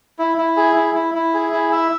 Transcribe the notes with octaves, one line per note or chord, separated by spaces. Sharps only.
E4
E4
G#4
E4
E4
E4
G#4
E4
E5